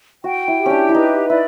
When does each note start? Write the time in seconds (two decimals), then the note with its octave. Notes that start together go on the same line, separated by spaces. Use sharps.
0.23 F#4 G5
0.48 E4
0.59 G4
0.66 C#4 D4
0.89 E4
0.94 D#4 B4
1.30 E4 D5